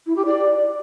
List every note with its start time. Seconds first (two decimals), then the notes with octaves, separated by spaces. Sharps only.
0.06 E4
0.16 G4
0.26 D5